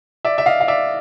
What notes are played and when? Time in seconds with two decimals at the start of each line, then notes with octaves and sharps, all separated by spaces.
0.25 D5 E5
0.38 E5
0.46 D#5 F5
0.61 F5
0.68 D5 E5